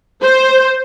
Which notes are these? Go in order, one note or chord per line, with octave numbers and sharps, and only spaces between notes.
C5